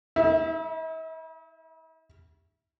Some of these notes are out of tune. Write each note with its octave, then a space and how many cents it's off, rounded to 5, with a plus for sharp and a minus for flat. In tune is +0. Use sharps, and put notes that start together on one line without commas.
E4 -45 E5 +0